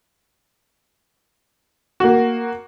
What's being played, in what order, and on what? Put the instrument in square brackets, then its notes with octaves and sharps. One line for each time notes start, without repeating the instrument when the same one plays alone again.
[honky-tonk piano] A#3 F#4